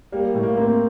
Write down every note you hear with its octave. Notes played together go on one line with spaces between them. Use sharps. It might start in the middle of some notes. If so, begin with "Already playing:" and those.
G3 A#3
A2
A#3
A#3 C4